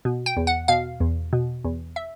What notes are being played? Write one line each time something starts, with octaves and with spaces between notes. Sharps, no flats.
B2
G5
E2
F#5
B2 F5
E2
B2
E2
E5